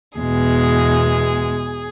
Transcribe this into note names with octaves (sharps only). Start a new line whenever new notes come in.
E2 B2 G#3 G#4